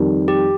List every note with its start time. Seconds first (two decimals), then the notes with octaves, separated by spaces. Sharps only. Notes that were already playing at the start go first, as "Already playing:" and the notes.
Already playing: F2 D#3 G3
0.28 G4